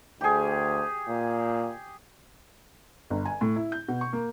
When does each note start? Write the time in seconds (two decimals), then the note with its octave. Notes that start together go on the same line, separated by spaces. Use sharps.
0.21 D2 G4 G#4
1.09 A#2
3.10 G1
3.26 G#5
3.41 A2
3.56 E4
3.72 G6
3.88 B2
4.01 C#6
4.13 A#3